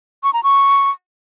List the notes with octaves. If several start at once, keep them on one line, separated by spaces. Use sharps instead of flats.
C#6
A#5
C#6